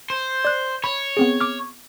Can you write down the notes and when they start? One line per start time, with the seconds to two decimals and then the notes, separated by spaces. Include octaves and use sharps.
0.10 C5
0.45 D5 F#6
0.84 C#5 B5
1.17 B3 C4 G#4
1.40 D6 F6